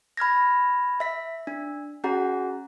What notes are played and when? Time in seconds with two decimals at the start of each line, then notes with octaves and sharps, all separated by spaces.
0.17 B5 F6 G#6 A#6
1.00 E5 B6
1.47 D4
2.04 C#4 F#4 G#4 F#5 A#5